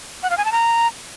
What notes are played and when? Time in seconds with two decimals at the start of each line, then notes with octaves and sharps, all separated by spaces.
0.23 F#5
0.30 F5
0.38 G#5
0.45 A5
0.52 A#5